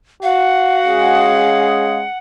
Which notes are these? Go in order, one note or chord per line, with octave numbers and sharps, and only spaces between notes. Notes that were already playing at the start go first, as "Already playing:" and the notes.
F#4 F5 F#5
G#3 C#4 G#4